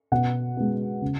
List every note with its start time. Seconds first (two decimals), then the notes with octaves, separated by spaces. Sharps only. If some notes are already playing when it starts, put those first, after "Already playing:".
0.12 B2 F#5
0.57 G#3 B3
1.02 C#3